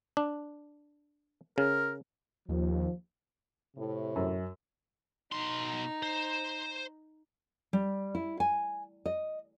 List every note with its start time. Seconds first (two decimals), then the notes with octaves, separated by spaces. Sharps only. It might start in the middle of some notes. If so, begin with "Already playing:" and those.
0.17 D4
1.58 C#3 A#4
2.49 D#2 F3
3.77 A2 C3
4.16 F#2
5.32 B2 D#4 C6
6.03 C5
7.73 G3
8.15 E4
8.40 G#5
9.06 D#5